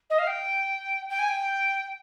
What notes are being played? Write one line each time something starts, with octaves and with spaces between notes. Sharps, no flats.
D#5
F5
G5
G5
G#5
G5